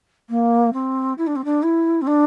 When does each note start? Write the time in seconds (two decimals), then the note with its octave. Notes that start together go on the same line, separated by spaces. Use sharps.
0.29 A#3
0.73 C4
1.18 E4
1.27 D4
1.36 C4
1.44 D4
1.63 E4
2.01 C4
2.07 D4